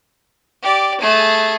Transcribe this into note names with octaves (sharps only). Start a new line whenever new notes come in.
G4 D5
A3 G#4